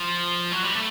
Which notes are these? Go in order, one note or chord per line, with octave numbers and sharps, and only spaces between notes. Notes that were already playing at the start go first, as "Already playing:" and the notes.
Already playing: F3
F#3
G3
A3